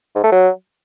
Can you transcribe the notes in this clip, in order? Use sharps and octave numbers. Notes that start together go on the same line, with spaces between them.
G#2
A3
F#3